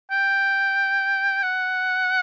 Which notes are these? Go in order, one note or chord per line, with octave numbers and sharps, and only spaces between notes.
G5
F#5